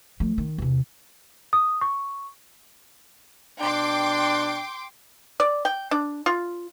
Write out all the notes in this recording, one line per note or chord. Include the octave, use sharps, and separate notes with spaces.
F3 A3
D#3
E2 C3
D#6
C#6
B2 D4 G5 C6 D6
D5
G5
D4
F4